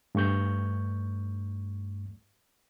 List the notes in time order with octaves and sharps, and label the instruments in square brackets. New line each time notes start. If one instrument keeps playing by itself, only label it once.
[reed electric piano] G2 A3 C#6 G6